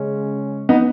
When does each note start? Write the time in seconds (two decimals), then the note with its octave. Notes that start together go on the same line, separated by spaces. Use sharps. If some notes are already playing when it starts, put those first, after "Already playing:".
Already playing: C#3 G#3 C#4
0.69 B3 D#4